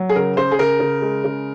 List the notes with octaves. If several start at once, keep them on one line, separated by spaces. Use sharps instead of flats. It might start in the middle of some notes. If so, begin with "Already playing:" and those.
Already playing: F#3
G#4
C#3 A#4
C#3 C5
G#4
C#3 A#4
C#3
G#3
C#3